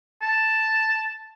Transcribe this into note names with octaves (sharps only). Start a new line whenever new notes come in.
A5